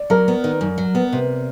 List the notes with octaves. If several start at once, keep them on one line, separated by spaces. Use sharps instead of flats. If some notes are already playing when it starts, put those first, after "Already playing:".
Already playing: D5
F#3 A#4
B3
D#3
F#2
F#3
B3
C3